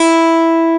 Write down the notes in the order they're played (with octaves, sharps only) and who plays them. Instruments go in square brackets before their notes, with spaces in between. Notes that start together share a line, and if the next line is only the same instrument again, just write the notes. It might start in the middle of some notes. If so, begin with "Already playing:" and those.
Already playing: [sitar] E4